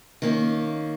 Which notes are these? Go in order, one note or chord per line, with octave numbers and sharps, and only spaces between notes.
D#3 A#3 C#4